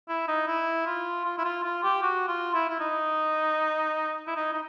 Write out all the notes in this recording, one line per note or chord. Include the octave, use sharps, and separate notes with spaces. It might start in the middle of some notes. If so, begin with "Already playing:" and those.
E4
D#4
E4
F4
F4
E4
F4
F4
G4
F#4
F4
E4
E4
D#4
E4
D#4
D#4